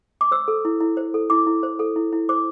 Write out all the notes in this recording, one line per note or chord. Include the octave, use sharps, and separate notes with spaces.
D6
C5 E6
A4
E4
E4
C5
A4
E4 D6
E4
C5
A4
E4
E4
C5 D6